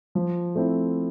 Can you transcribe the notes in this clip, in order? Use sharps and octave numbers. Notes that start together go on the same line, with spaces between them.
F3
A3 C4 E4